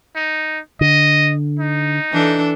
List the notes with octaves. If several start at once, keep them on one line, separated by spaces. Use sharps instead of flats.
D#4
D3 D#5
D#4
E3 D4 A4